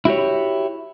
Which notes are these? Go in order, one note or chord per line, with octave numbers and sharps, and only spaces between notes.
E4 F#4 G4 C#5